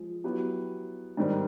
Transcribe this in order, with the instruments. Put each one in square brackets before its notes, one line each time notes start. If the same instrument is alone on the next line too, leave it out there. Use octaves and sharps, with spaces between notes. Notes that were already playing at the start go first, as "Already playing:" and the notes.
Already playing: [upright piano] F3 G#3
F#3 B3 E4 G4
G#2 D#3 G3 C4